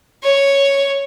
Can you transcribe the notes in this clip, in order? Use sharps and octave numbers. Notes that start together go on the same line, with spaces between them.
C#5